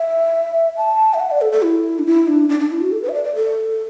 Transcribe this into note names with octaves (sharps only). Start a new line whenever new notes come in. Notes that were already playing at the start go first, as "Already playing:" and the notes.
Already playing: E5
A5
E5
F#5
D5
A4
A4
E4
D4
E4
D4
D4
D4
E4
F#4
A4
B4
E5
D5
D5
A4